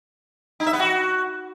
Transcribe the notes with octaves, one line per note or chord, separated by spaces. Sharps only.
D#4
E5
B3
F#4